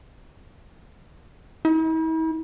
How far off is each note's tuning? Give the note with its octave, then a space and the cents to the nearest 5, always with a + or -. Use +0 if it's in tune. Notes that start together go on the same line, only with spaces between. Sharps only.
E4 -45